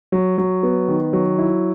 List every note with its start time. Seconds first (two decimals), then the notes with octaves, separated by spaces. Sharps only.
0.12 F#3
0.38 F#3
0.63 B3
0.88 D#3
1.13 F#3
1.39 E4